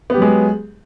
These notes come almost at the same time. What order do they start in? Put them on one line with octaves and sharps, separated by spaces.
B3 G4 F#3 G#3